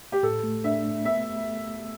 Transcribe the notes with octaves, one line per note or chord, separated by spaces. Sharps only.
G4
A2 A4
A3
D4 E5
A3
B3 E5